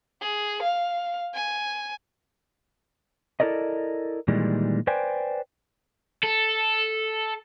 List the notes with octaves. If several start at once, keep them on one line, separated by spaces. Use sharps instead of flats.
G#4
F5
G#5
E4 A4 A#4 D5 D#5
A#2 D#3 E3 G3 G#3
B4 C5 D5 G5 G#5
A4